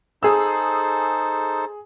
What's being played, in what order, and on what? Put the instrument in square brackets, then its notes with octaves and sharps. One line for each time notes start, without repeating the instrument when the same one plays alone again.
[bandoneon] D#4 A4 C5 [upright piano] G#4 E6